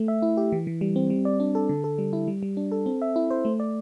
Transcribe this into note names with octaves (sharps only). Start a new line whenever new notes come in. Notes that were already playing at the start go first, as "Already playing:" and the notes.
Already playing: A3
E5
E4
G4
E3
E3
G3
C4
G3
D5
D4
A4
D3
A4
G3
E4
G3
G3
D4
A4
C4
E5
E4
C5
A3
D5